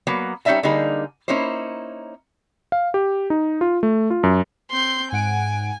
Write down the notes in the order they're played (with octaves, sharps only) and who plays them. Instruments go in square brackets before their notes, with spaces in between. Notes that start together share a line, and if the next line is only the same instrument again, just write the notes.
[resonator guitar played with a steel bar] F#3 A#3 B3
G3 C#4 D#4 D#5 E5 A5
D3 G3 A#3 D#4 G#4
A#3 C#4 D#4 E4 C5
[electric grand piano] F5
G4
D#4
F4
A3
F4
F#2
[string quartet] C4 C6 G6
[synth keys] G#2 F#5 D7 [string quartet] G#5